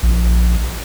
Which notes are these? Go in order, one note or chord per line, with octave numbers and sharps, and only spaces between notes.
A#1